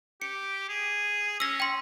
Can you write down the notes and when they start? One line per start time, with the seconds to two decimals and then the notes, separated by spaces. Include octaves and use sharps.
0.22 G4 C#7
0.69 G#4
1.40 C#4 E6 A#6
1.60 G5 C6